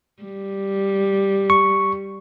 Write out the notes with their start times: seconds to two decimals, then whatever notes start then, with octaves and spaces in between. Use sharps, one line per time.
0.23 G3
1.50 C#6